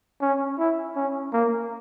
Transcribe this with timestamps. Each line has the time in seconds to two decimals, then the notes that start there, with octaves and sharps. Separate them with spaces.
0.21 C#4
0.59 E4
0.96 C#4
1.33 A#3